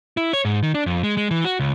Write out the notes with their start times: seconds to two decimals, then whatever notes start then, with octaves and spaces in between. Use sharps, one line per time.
0.17 E4
0.33 C#5
0.45 G#2
0.63 D#3
0.74 D4
0.86 F2
1.03 G#3
1.17 G#3
1.31 E3
1.44 F#4
1.59 C#2